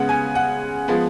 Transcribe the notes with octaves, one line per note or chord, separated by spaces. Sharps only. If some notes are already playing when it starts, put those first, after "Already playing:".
Already playing: C#3 G#3 B3 F#5
G#5
F#5
F3 G#3 B3